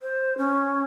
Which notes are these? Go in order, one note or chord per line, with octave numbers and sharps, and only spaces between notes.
C5
C#4